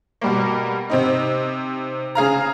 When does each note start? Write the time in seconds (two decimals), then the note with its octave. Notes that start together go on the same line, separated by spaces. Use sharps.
0.21 B2 G3 A#3
0.90 C3 C4 D#4
2.15 C#3 G#4 F5 A#5